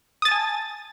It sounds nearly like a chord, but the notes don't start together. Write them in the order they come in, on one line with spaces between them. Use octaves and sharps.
D#6 A6 A5 G#5